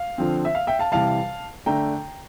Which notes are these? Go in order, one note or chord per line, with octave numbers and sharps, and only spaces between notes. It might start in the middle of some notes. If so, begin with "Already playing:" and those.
Already playing: F5
D3 F3 C4
E5
F5
E5 G5
F5 A5
C3 E3 G3 F5 A5
D3 A3 D4 G5 A#5